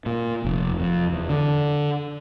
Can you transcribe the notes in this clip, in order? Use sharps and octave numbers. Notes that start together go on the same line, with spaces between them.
A#2
F1
F2
E2
D3